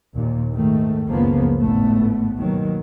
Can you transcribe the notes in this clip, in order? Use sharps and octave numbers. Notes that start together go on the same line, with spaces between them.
D#2 A#2
G#2 D#3 A3
F#1 C#2 C#3 F3 A#3 B3
G#1 A2 A3 B3
D#2 B2 D#3 F#3